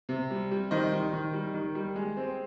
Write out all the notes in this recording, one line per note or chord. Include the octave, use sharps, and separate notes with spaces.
C3
G3
G3
D#3 C5 D#5
D#3
D#3
G3
D#3
G3
G#3
C4